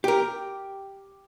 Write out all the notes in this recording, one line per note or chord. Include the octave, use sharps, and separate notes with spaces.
G4 A#4